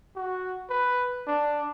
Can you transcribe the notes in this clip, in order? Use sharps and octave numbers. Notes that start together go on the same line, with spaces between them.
F#4
B4
D4